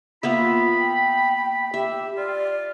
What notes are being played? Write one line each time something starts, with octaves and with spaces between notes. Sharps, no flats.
A#3 B3 F4 E5 B5
G5
G4 E5
F4 D5